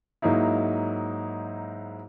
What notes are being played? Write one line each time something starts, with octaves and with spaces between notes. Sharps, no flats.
G#2 F#3 A#3 D#4 E4